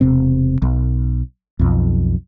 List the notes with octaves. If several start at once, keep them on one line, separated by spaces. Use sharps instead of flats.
E1 C3 C4
B1
B1 F2